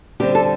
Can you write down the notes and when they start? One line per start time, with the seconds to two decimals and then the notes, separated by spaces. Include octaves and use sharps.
0.20 D3 G3 C4 G4
0.35 A4